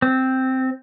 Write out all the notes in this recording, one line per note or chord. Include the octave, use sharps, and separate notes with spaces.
C4